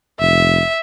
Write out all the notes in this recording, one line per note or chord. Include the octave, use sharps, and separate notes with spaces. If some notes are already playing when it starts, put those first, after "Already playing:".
F1 E5